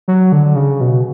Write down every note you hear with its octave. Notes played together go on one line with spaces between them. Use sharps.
F#3
D3
C#3
B2